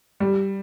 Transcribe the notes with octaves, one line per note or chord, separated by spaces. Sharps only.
G3